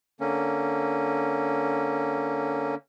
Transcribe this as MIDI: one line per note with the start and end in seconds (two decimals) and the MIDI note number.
0.20 2.75 50
0.20 2.75 58
0.20 2.75 61